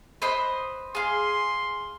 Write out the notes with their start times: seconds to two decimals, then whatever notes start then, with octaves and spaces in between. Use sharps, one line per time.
0.22 B4 C5 D#5
0.95 G#4 F5 C6